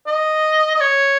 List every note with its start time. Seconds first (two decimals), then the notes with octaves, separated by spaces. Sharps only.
0.07 D#5
0.75 D#5
0.80 C#5